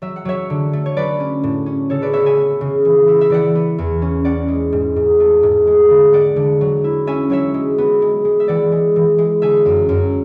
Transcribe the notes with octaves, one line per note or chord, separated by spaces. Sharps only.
F#3 E5
F#5
F#3 C#5 E5
D3
A3
C#5
F#3 B4 D5
C#4
A2
C#4
C#3 A4 C#5
B4 D5
B3 C#5 E5
E5 G#5
B3
C#3
E3
E4
E5
E3 D5 F#5
B3
E2
C#4
C#4 D5 F#5
G#3
G#2
G#2
A3
G#2
G#3
D3
G#3 D5 F#5
D3
F#3
E4
C#4 E5 G#5
F#3 C#5 E5
G#3
B3
G#3
G#3
E5
E3 D5 F#5
G#3
E3
G#3
D3 E5 G#5
F#2
F#2